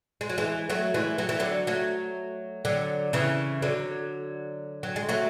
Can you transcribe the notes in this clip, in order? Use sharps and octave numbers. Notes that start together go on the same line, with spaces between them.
G#3
F#3
E3 G#3
F#3 A3
E3 G#3
F#3
E3
D3 F#3
F#3 A3
D3 F#3
C#3 E3
D3 F#3
F#3
G#3
F#3 A3